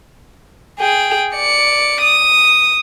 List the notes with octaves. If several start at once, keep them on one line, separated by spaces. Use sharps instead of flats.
G#4 G5
D5 C#7
D#6